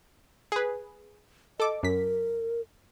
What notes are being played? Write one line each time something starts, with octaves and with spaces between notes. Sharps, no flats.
G#4 B4
A4 D#5 D6
F#2 A#4 B6